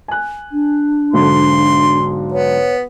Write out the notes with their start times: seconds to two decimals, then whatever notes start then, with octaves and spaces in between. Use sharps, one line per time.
0.08 G#5 F#6
0.52 D4
1.13 B1 G#2 D3 C6
2.32 B3 C#5